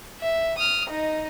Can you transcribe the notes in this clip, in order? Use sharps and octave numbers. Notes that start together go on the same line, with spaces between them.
E5
D#6 F6
D#4 D#5